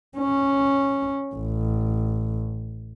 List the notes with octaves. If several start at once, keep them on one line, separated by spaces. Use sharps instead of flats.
C#4
A1